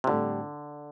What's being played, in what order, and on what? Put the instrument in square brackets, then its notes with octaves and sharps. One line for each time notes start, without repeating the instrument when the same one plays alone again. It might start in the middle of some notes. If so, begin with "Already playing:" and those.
[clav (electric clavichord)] C3
[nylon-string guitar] A2 G3 C4 G4 [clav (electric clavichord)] D3